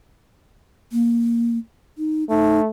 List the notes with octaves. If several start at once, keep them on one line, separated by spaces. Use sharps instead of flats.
A#3
D#4
A3 D#4